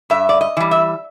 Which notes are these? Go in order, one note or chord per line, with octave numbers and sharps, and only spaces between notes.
G2 E5
D5
D#5
E3 G3
E5